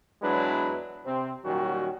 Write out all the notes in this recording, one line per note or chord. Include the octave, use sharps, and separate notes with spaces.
E2 F#3 G#3 D4 E4 B4
C3 C4
A#2 D#3 F#3 G3 C#4 F#4